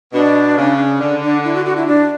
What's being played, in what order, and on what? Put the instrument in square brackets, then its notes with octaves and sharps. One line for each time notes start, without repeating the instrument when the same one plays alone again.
[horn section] B2 [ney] D4
[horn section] C#3
[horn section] D3 [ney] D4
[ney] D4
E4
F#4
F#4
E4
D4